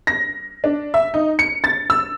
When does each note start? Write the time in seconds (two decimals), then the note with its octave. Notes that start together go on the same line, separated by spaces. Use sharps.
0.07 A#6
0.64 D4
0.94 E5
1.14 D#4
1.39 C#7
1.64 A6
1.90 E6